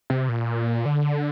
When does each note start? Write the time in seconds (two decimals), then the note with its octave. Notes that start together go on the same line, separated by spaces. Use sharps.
0.10 C3
0.29 A#2
0.86 D3